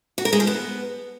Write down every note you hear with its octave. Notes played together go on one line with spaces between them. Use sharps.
F#4
A#4
G#3
F3
B3